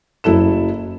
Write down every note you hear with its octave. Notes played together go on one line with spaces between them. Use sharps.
F#1 F#3 E4 A4 E7